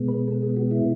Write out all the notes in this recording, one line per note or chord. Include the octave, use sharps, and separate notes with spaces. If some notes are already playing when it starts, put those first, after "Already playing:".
Already playing: B2 G#3 B3
B4
A4
G#4
F#4
E4